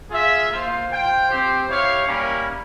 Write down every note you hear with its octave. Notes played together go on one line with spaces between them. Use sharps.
F4 G#4 E5
A#3 F4 C5
F4 C5 G5
C4 G4 C5
E4 G4 C#5 F5
G3 A#3 C#4 E4 A#4